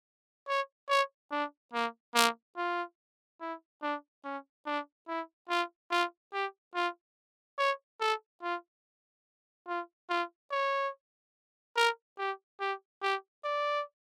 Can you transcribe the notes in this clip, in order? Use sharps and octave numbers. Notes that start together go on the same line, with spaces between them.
C#5
C#5
D4
A#3
A#3
F4
E4
D4
C#4
D4
E4
F4
F4
G4
F4
C#5
A4
F4
F4
F4
C#5
A#4
G4
G4
G4
D5